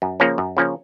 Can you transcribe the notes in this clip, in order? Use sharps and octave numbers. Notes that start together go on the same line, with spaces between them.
F#2
C#3 F3 A#3 C#4
F#2
C#3 F3 A#3 C#4